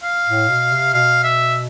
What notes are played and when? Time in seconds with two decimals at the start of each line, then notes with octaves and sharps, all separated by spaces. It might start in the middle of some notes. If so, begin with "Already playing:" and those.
0.03 F5
0.27 A2
0.48 B2
0.72 C3
0.94 B2 F5
1.24 E5